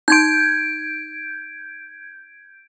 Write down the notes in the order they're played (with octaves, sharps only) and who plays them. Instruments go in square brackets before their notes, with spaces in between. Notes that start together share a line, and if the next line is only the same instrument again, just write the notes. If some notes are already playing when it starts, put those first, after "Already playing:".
[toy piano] D#4 C6 [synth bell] G6 G#6 D7